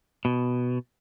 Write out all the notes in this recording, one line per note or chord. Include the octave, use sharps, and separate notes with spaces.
B2